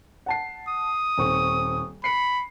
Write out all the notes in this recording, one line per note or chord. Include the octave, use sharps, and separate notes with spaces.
F#5 A5 C7
D#6
D#1 C4 C#6
B5 C7 C#7